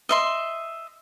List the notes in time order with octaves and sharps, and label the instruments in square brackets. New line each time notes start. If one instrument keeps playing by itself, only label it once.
[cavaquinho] D#5 E5 C6